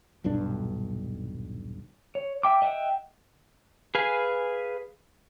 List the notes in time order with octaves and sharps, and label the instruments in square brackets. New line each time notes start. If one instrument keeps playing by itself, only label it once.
[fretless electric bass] D#1 B1 G2 D4
[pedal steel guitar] C#5
E5 G5 D6
D#5 E5 F#5 G5
G#4 B4 F5 G#5